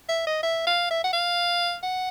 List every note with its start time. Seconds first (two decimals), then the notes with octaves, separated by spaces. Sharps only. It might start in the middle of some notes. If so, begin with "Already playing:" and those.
0.09 E5
0.27 D#5
0.43 E5
0.67 F5
0.90 E5
1.04 F#5
1.13 F5
1.83 F#5